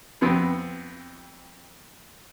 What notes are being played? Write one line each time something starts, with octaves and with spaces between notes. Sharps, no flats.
F2 B3 C4